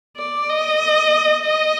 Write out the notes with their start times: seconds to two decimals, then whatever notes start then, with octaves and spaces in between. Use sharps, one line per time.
0.17 D5
0.50 D#5
1.43 D#5